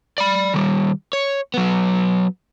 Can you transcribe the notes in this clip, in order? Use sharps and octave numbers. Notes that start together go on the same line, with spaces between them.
D5 B5
D#3 G3
C#5
F#3 B3